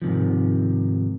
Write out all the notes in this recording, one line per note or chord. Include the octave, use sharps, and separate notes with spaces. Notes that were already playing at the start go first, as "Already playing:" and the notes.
G#2 C3 D#3 F3